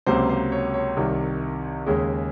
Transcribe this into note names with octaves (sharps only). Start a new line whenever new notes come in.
C#2 C3 F#3 A#3 C5
C5
C#5
C#5
C2 C3 D#3
D#2 C#3 G#3